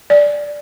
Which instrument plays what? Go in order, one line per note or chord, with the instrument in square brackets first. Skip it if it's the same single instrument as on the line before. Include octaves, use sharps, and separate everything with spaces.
[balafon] D5